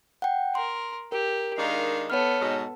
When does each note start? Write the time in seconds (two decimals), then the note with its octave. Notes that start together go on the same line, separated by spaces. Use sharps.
0.22 F#5 G5
0.55 A#4 C6
1.12 G4 A#4
1.58 D#3 G#3 D4 D#4 F5
2.10 B3 A4 C#5 F6
2.40 G#2 B2 G#3